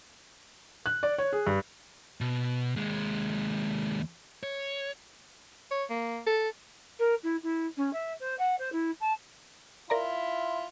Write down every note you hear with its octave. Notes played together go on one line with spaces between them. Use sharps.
F#6
D5
C#5
G#4
G2
B2
D#2 G#3
C#5
C#5
A#3
A4
A#4
E4
E4
C#4
E5
C5
F#5
C5
E4
A5
E4 F4 A#4 D5 A#5